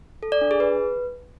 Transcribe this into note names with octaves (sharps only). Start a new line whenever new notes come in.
A4
D5
D4
G#4
B4